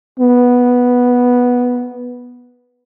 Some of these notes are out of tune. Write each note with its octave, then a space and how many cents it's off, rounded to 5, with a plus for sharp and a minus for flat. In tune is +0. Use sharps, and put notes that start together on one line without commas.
B3 -5